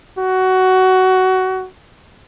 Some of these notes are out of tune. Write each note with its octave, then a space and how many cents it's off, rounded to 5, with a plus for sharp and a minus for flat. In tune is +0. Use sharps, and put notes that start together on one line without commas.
F#4 +15